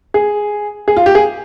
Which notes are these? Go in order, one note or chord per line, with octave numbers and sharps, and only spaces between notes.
G#4
G#4
F4
G4
G#4